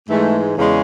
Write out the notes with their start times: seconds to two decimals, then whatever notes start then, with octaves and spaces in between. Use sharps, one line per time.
0.09 G#2 E3 G#3 A3
0.57 E2 C#3 G#3